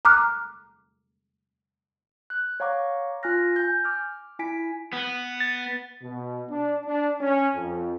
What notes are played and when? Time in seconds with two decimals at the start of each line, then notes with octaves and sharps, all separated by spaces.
0.05 A#5 D6 F6 F#6
2.30 F#6
2.60 C#5 F5 F#5 A#5 C#6 D6
3.23 F4 G#5 F6 F#6 A#6
3.56 G#5 G6
3.84 D6 F6
4.39 E4 G#5 B6 D7
4.93 B3
5.40 A6
6.03 B2
6.50 D4
6.86 D4
7.21 C#4
7.56 F2